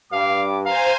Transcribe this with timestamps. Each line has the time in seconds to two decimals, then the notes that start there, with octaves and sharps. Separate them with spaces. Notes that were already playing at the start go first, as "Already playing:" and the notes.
0.12 G2 F5 D6
0.66 C5 F5 G#5 A#5